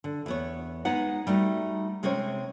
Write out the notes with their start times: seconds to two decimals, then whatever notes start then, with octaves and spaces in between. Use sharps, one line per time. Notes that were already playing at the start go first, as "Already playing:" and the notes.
0.04 D3
0.26 E2 B3 C#5
0.85 G#3 B3 D#4 F#5
1.27 G3 A3 D#4 F#4
2.03 C3 G#3 C4 C#4 C5 C#5